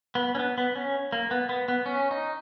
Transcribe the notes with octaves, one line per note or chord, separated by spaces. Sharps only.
B3
C#4
B3
B3
C#4
A#3
B3
B3
B3
C#4
D#4